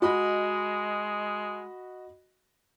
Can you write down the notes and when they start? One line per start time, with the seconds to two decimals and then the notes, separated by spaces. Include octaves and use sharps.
0.02 G#3 F#4 D#5 B5